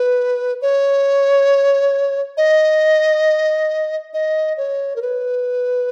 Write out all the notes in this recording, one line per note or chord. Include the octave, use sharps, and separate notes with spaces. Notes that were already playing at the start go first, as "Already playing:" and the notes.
Already playing: B4
C#5
D#5
D#5
C#5
A#4
B4